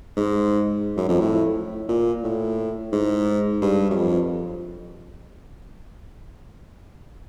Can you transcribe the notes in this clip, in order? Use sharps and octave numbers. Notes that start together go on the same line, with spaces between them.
G#2
F#2
F2
A2
A#2
A2
G#2
G2
F#2
F2